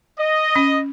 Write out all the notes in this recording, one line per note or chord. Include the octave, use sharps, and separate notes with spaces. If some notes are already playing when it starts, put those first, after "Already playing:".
D#5
C#4